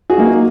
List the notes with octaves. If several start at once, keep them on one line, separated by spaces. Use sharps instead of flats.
F#4 G#4
F#3 A#3 D#4